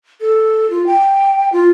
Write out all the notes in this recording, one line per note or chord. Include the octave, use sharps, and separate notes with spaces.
A4
F4
G5
F4